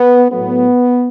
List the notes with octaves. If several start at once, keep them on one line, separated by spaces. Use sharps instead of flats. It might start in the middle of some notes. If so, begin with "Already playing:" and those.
Already playing: B3
A2 F#3 A3 B3